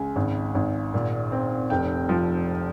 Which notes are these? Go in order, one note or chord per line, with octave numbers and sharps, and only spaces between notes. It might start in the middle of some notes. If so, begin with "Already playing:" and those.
Already playing: C#2 G#5
G#1
G#1
A#2
C4
F1 G5
F3